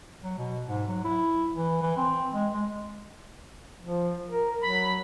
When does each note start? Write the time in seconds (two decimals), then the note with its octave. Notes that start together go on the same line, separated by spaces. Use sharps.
0.23 F#3
0.38 B2
0.67 G#2
0.89 F#3
1.04 E4
1.56 E3
1.82 E3
1.97 C4
2.34 G#3
2.54 G#3
3.82 F3
4.29 A#4
4.62 F#3 B5